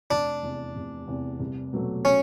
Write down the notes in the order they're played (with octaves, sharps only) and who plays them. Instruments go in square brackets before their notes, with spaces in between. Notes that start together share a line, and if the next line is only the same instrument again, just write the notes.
[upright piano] F1 [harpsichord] D4
[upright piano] E2 C3
F1
E2 C3
C2
B2 F#3 A3
[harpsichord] C#4